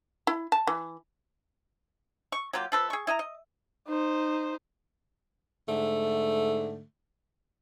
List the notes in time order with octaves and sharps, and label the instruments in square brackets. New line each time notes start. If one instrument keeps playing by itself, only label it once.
[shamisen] E4
A5
E3
[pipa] C#6
F#3 A#3 F4 G4
F3 A4 B4
G#4 C#6
E4 D#5 G5 A#5
D#5
[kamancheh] D#4 C5
[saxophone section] G#2 D3 A3